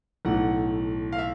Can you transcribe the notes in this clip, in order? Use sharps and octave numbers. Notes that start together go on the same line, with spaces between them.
B1 A2 E3 A3 F#5
F5
E5